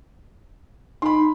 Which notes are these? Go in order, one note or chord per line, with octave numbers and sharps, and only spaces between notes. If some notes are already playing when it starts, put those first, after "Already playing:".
D#4 B5 C6